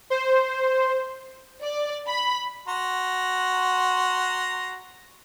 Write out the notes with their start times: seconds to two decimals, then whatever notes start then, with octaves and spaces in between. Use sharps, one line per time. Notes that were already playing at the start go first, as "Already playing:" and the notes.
0.10 C5
1.63 D5
2.08 B5
2.68 F#4 A#5 C6